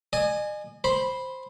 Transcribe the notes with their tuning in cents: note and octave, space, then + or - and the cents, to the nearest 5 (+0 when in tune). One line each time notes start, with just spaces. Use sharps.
D#5 -45 G#5 +0
C5 +0 B5 -5